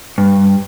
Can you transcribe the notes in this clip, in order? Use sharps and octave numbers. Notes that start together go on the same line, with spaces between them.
G2